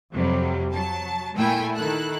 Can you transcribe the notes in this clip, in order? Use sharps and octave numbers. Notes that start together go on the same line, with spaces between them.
F2 C3 F#3 G3
F#3 A5
A#2 A3 E4 G5 G#5
D#3 E4 A4 F#6